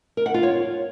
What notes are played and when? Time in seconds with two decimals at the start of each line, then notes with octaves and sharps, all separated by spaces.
0.17 A#4
0.26 F#5
0.34 F4
0.43 C#5